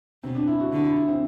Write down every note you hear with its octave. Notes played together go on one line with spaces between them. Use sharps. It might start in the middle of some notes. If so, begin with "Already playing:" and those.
B2 C4
D4
E4
F#4
D3 F#4
E4
E4
C4